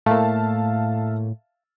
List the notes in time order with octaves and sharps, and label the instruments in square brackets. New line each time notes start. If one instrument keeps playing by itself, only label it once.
[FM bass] A2 [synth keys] A3 A#3 [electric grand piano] E5 F5 A5